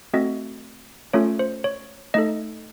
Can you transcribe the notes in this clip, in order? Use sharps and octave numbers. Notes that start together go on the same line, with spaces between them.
A3 C4 F#4 A4 D#5
A3 C#4 F4 A4 C#5
C5
C#5
A3 D#4 A4 D#5